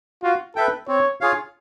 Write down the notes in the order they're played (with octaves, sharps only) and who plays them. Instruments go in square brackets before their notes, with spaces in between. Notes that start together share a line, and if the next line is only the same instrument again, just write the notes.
[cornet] F4 [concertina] F#4
[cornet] A4 [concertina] B4 E5 G5
[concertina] C4 [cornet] C#5
[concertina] F4 G#4 C#5 F5